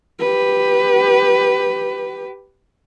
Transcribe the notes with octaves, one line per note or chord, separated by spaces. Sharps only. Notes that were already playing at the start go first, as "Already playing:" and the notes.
G4 B4